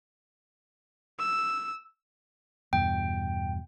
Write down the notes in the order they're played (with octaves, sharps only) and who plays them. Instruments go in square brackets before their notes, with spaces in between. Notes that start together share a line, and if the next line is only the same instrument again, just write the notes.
[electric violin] E6
[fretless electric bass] E2 G2 B2 [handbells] G5